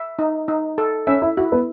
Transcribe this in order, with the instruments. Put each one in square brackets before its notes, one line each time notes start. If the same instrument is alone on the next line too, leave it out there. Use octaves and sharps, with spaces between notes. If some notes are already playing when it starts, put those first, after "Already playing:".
Already playing: [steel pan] E5
D#4
D#4
A4
[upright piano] C#4 C#5 [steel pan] E5
[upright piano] E4
[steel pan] E4 [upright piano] F#4
[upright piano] B3 B4